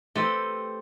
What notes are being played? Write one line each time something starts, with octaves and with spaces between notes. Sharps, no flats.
A3 C4 G4 A4 B4